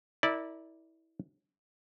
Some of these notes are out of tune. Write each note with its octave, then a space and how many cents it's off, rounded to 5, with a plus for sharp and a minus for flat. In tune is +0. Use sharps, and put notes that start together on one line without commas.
E4 -20 A#4 +0 D5 +0